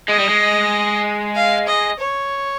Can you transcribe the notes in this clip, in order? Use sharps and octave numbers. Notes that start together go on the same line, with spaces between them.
G#3 D#5
G3
G#3
F5
D#5
C#5